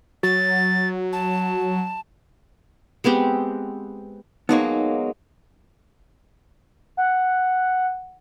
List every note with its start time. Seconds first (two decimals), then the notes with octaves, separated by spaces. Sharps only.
0.23 F#3 A6
1.13 A5
3.04 G#3 B3 C4 G4
4.49 F#3 G#3 A#3 B3 D#4 C#5
6.97 F#5